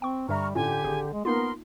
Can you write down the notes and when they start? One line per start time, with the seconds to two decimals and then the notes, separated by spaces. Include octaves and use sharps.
0.02 C4 G5 C#6
0.29 G2 D3 G3 E5 A#5 C#6 F6
0.55 A2 D3 C#4 F4 G4 G#5
0.84 G#1 D3 G#4
1.13 G#3
1.25 A#3 B3 D#4 F4 A#4 C6